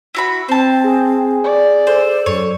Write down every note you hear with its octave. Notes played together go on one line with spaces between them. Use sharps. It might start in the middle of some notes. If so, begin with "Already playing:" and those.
E4 F#4 B5
C4 C5 A5
G#4
D5
A4 C5
F#2 C#5